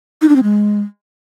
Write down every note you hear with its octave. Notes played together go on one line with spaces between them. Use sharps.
D#4
D4
C4
G#3